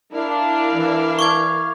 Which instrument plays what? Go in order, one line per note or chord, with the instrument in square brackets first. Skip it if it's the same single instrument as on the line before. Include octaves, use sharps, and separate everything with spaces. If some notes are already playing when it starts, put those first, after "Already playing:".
[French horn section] D4 [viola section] E4 A#4 F5
[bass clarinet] E3 [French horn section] D4
[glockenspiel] C#6 D6 G#6